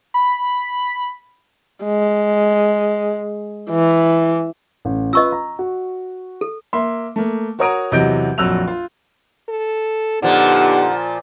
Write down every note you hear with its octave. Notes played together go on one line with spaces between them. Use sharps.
B5
G#3
E3
A1
F4 B4 D#5 C#6 E6
A#5
F#4
A4
A#3 E5 C6
A3 A#3
F#4 A#4 C#5 A#5 D#6 D7
E2 C3 F#3 D#5 G6 D7
A#1 F2 F#3 E6 F#6 F7
F4
A4
A#2 D3 F3 B3 D#4 G4 F#5